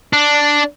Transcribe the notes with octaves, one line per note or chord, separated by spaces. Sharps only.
D4